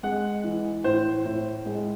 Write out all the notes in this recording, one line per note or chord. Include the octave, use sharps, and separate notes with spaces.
G#3 F#5
E3
A2 C5
A2
G#3